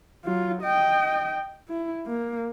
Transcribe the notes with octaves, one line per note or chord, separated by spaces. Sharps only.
F#3 F4
D#5 G5
E4
A#3